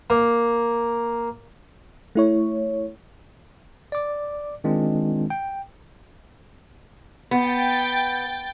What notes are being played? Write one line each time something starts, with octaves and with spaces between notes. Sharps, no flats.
A#3
A3 E4 C#5
D5 D6
D#3 G#3 C4 D4 F4
G5
B3 G5 A6